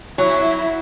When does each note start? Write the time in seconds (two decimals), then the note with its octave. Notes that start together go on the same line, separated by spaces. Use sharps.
0.18 F#3 E4